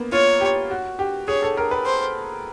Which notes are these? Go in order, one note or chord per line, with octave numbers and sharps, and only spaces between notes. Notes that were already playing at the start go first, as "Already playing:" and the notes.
Already playing: A#3 B3
F4 C#5
G4
F#4
G4
G#4 C#5
A4
A#4
B4
C5